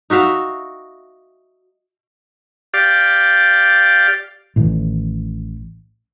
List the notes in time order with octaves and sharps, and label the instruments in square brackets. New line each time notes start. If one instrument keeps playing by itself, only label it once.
[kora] D#4 F#4 E5 F5
[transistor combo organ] G4 D5 F5
[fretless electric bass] A1 A2 D#3 E3